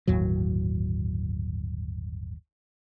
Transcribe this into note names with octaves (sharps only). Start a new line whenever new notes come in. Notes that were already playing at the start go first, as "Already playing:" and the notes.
G1 D#2 A2 F#3